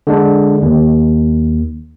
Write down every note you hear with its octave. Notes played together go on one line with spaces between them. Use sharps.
D3 G#3 D4
D#2